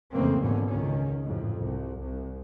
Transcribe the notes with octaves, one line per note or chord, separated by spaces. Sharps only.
F2 C#3 E3 A3 A#3 C4
G#1 E2 B2 D3 C#4
C#2 D#3 C#4
A1 F2 G#2
C2
C2